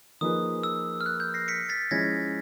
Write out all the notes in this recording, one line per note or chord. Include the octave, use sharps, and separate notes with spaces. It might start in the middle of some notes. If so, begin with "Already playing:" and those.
F3 A#3 D#4 G#4 B4 D#6
E6
F6
F#6
G6
A#6 C7
B6 C#7
A6 B6
F3 G#3 C#4 E4 G#4 G#6 A#6